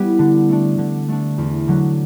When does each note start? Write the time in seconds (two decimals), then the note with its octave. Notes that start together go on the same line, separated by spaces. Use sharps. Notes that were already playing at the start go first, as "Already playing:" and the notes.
Already playing: G3 B3 E4 G4
0.19 D3
0.49 A3 D4
0.78 D3
1.08 A3 D4
1.38 E2
1.68 D3 F#3